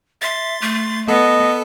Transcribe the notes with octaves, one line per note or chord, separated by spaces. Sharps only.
E5 C6 A6
A3
B3 A4 D#5